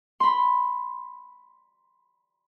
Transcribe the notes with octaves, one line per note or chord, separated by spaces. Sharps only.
B5 C6